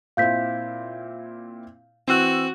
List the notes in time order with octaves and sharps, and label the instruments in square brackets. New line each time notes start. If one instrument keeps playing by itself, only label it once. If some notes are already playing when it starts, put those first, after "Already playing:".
[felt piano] A#2 C4 E4 [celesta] F5 G6 B6
[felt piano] E3 E6 [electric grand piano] C4 F#6 [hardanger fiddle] F#4